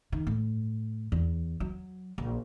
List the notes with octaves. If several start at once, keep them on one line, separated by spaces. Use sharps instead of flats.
D#3
A2
E2
F#3
A#1